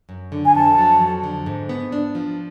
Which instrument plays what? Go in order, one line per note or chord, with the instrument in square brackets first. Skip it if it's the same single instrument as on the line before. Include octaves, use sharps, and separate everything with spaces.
[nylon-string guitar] F#2
D3
[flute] G#5
[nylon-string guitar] F2 [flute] A5
[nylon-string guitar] F#3
F2
D3
G#2
B3
D4
F3